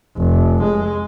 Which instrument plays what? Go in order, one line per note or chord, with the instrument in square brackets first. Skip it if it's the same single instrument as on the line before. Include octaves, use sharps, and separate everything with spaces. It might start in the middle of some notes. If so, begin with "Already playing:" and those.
[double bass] F1
G#3